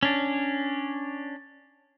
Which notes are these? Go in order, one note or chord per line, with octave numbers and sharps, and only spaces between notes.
C#4 D4